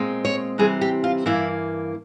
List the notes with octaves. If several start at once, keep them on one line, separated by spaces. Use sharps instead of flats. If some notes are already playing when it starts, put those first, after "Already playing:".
Already playing: A#2 G#3 C4
C#5
C3 E3 G3 C4 G#4
G4
F4
G2 E3 A#3 E4